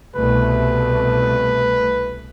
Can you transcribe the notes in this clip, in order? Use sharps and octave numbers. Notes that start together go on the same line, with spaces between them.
C2 B2 A3 B4